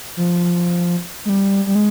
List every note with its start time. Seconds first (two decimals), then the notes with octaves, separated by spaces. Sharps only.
0.17 F3
1.25 G#3
1.29 G3
1.67 G3
1.75 G#3